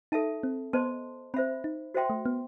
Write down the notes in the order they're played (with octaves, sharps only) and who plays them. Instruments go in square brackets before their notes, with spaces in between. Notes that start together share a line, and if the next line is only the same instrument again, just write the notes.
[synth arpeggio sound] D#4 [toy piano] A4 E5 A5
[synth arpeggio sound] C4
[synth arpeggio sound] B3 [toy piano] C5 D#5 A5 C6
[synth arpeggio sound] C4 [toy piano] C5 E5 B5
[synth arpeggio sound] D#4
[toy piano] F#4 C5 E5 G5 C6
[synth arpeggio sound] A3
B3